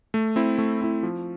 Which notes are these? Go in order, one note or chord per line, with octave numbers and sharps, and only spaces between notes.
A3
C4 E4
A3
C4 E4
F3